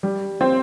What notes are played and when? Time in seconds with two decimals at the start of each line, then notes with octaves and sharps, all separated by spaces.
0.03 G3
0.41 C4